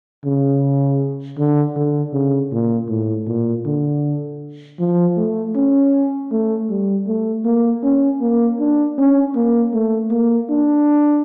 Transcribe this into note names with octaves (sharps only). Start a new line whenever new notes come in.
C#3
D3
D3
C#3
A#2
A2
A#2
D3
F3
A3
C#4
A3
G3
A3
A#3
C#4
A#3
D4
C#4
A#3
A3
A#3
D4